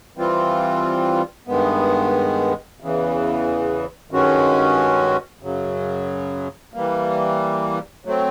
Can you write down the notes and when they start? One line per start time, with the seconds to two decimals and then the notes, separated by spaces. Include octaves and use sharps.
0.17 E3 G3 C4 F4
1.48 G2 D#3 G#3 B3
2.80 E2 C#3 E3
4.11 G2 D#3 G#3 C#4 F#4
5.42 F#2 C#3 F#3
6.74 E3 G3 A#3
8.05 F#3 A3 C4